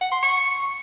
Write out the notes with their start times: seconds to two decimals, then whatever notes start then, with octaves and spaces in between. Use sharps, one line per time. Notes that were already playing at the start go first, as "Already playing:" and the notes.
0.01 F#5
0.12 C6
0.22 C#6